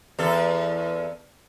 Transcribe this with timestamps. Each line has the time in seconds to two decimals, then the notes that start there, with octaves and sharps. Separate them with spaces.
0.19 E2 A4